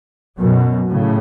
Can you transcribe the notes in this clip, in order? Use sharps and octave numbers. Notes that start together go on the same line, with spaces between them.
F#2 B2
A2 C#3